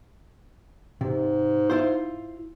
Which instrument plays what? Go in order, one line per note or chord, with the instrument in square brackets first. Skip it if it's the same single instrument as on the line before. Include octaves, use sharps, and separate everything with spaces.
[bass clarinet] G#2 [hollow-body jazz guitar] C3
[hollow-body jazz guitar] E4 F4 C5